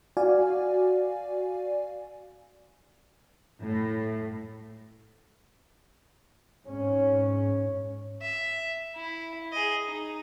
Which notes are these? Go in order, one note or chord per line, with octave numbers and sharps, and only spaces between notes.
F#4 D5 F5 G#5
A2
G#2 C#4
E5
E4
G#4 D#5
D#4